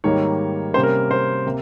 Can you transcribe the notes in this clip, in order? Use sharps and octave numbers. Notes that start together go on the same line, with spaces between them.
G#2 D#3 G3 A#3 C#5
C3 G3 A#3 C#4 C5
A#4
C5
C3 A#3